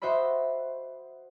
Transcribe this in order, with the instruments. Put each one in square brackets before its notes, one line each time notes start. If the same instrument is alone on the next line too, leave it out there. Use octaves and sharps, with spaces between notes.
[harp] F#4 C5 D#5 E5 B5